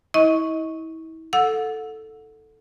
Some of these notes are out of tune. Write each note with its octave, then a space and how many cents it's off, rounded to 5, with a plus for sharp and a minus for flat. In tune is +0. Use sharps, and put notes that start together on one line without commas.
E4 -35 D#5 +25 C#6 +0
A4 +0 F#5 -25 E6 +0